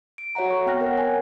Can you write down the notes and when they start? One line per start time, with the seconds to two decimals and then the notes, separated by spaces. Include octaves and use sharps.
0.18 D7
0.35 F#4 C#5 E5 F#5 A#5
0.50 A4 C#6
0.66 B3 C4 G5 F6 F#6 A#6
0.81 A#4 C#5 F#5
0.98 G#5